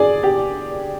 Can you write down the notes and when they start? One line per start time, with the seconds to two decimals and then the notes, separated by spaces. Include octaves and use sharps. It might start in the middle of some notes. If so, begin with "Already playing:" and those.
Already playing: G#4 D5
0.23 G4